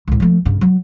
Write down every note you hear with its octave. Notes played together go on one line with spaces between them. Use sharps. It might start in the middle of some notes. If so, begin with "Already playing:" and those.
C#2 A2
F3 A3
G2 C#3
F#3